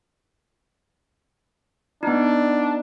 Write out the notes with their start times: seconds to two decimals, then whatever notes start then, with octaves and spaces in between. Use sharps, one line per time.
2.03 B3 D4 D#4